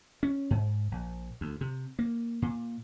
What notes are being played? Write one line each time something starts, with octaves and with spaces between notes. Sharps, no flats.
C#4
G#2
A#1
D2
C3
A#3
A#2